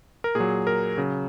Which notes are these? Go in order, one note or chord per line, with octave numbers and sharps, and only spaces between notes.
A#4
A#2 F#3 G#4
A#4
C#3 F#3